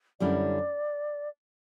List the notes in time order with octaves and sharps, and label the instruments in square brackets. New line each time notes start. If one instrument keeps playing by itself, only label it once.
[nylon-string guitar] F#2 D3 G3 C#4 E4 [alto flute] D5